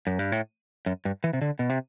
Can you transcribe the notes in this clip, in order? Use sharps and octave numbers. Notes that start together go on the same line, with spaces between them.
F#2
G2
A2
F#2
G2
E3
C3
D3
B2
C3